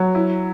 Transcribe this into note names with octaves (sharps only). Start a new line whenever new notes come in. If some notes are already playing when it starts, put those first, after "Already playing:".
Already playing: F#3
E4